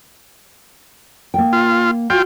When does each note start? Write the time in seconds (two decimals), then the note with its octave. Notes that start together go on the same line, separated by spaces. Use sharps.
1.34 A#3 G5
1.53 F4
2.10 F4 F#4 G5